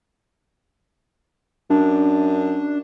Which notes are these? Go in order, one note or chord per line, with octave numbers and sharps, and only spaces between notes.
F#2 D4